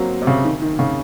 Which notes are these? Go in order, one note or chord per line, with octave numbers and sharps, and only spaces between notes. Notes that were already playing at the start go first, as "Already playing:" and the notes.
Already playing: F#3 A#3 C4
C3
C#3
D#3
D#3
C#3